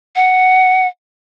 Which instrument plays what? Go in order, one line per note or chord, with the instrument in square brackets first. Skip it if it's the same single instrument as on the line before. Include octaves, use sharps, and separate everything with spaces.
[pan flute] F#5